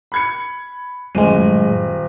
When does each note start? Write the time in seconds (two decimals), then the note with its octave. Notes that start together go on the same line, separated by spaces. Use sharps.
0.12 B5 G#6 C#7
1.15 D#1 F#2 A2 G#3 D#7